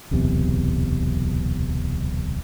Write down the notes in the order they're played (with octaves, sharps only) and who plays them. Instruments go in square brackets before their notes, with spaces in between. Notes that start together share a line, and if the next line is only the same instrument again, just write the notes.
[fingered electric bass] D1 B1 E2 C3